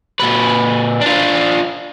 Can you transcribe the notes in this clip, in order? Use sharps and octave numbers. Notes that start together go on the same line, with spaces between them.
A#2 B4
D4 F4